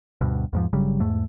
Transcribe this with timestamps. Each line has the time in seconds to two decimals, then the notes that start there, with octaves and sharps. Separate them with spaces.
0.21 D2 G2 B2
0.53 E2 G#2 F3
0.73 G1 C#3 F#3 G3
1.00 E2 G#2 A3